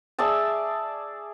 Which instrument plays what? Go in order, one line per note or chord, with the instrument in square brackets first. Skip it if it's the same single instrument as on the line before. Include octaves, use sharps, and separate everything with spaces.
[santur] G#4 D5 E5 A5